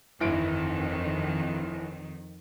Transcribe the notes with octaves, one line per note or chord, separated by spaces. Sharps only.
G1 F2 D#3 E3 D7